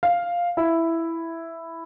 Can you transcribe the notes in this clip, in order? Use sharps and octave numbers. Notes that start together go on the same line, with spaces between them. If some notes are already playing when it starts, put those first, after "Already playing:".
F5
E4